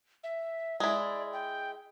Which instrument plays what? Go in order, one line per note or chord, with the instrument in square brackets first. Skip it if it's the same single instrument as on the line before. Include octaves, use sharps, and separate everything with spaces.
[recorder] E5
[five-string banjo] G#3 E4 [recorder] D5
[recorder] G5